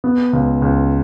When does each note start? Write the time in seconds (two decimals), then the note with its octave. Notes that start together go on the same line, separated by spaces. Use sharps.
0.04 B3
0.33 C#2
0.62 C#2